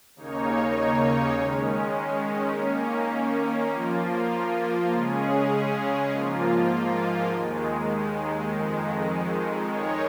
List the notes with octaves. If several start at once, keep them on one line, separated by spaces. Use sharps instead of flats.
D#2 C#3 A#3 D#4 C#5
D#3 G#3 C#4
D#3 A#3 C#4
F3 A#3 F4
C#3 G#3 C#4 G#4
G#2 F3 A#3 F4
D#2 D#3 G#3
F2 D#3 G#3
D#3 G#3 D#4 C#5